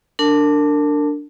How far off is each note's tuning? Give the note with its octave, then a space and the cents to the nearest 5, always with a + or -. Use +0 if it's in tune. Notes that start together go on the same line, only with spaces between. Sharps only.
D4 +0 A#4 -35 A5 +0